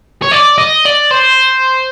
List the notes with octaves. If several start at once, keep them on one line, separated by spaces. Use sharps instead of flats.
C#5
D5
D#5
D5
C5